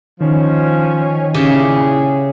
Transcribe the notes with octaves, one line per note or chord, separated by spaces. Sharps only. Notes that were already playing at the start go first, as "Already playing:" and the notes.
D#3 F3 C#4
A#2 C#3 E4 G4 G#4